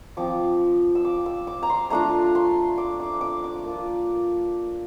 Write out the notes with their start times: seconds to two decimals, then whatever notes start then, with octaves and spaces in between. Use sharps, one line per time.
0.17 F3 C4 F4 D6
0.95 E6
1.05 D6
1.26 E6
1.47 D6
1.63 A#5
1.70 C6
1.90 A3 D4 F4 A#5
2.35 C6
2.78 D6
3.00 D6
3.21 D6
3.44 D6
3.64 A#3 F4